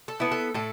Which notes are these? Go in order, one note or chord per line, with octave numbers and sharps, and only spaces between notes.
A4
B3 E4
A4
A2 A4